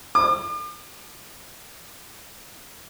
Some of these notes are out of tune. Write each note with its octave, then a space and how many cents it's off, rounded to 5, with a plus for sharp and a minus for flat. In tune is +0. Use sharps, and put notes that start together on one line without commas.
D6 +45